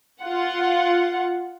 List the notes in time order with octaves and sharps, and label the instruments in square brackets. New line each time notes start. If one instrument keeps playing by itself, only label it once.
[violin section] F4 F#5